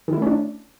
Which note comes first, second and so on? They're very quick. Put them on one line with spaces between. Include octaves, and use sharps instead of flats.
D#3 E4 A3 C#4 D4